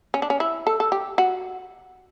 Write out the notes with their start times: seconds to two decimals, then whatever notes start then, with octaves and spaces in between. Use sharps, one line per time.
0.14 C#4
0.22 D4
0.30 C#4
0.40 E4
0.67 A4
0.80 A4
0.92 G4
1.18 F#4